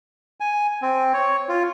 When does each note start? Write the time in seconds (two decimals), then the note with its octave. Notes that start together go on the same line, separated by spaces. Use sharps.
0.40 G#5
0.82 C4
1.14 C#5
1.49 F4